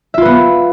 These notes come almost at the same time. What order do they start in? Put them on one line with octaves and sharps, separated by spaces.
E5 F4 B4 B3